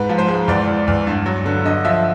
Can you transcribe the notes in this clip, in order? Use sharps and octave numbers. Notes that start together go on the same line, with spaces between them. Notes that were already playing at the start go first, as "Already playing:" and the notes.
Already playing: G#2 B4
F3
C5
G#3
E2 D5
E2
E2
G2
F#3
D3
D3 D#5
F3 E5